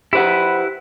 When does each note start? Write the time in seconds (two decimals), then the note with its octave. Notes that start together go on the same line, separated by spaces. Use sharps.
0.13 E4 G4 B4 C5 F#5